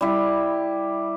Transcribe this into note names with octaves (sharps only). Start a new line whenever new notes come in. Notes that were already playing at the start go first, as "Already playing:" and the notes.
G3 E4